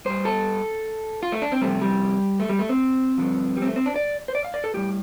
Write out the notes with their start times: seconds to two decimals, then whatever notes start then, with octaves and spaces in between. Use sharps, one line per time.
0.05 G2 G3 C5
0.25 A4
1.23 F4
1.32 A3
1.42 D4
1.52 C4
1.61 F2 C3 G3 A3
1.81 G3
2.40 A3
2.49 G3
2.59 A3
2.69 C4
3.18 G2 D3 F3
3.57 G3
3.62 C4
3.67 A3
3.76 C4
3.86 D4
3.96 D5
4.28 C5
4.35 D5
4.45 F5
4.54 D5
4.64 A4
4.74 A2 G3 G4